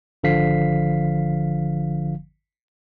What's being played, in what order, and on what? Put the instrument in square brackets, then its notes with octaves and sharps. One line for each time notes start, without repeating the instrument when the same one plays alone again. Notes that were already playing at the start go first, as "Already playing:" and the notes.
[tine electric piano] G#1 D3 F3 F5 B6 C7